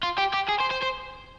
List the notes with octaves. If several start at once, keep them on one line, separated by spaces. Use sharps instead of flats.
F4
G4
G4
G#4
C5
C5
C5